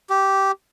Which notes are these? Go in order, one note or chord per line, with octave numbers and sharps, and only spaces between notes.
G4